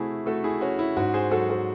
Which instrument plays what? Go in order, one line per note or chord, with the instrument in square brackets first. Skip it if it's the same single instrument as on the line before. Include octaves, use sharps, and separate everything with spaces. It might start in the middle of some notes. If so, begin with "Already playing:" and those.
Already playing: [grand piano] C3 A3 E4 F#4 G#4
A3 F#4 A4
E4 G#4
C#4 F#4
E4
G#2 F#4
G#4 C5
F#3 F#4 A4
F#4 A4